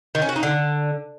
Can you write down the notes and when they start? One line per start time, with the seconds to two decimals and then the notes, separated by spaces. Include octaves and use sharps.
0.15 D#3
0.22 C#4
0.29 F#4
0.36 D#4
0.43 D3